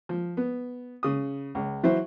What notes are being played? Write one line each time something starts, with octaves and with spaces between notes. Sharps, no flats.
F3
B3
C#3 D#6
C#2
E3 F#3 E4 F#4 C5